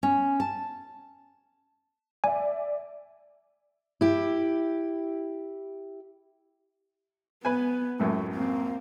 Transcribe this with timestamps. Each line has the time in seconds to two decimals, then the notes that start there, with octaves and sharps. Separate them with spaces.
0.03 C#4
0.40 A5
2.24 D5 E5 G#5
4.01 E4 G4
7.45 B3 B4 G#5
8.00 C#2 F#2 A2 A3
8.33 A#3 C4